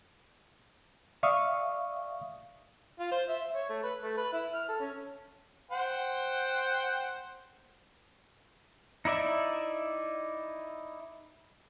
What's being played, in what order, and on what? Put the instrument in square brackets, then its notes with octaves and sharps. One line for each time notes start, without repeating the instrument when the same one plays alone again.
[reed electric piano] D5 E5 F5 C#6 D#6
[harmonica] F4
C5
E5
C#5
A3
B4
A3
B4
E4
F6
A4
C#4
C5 F#5 G5
[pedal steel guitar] D#4 E4 D5 E5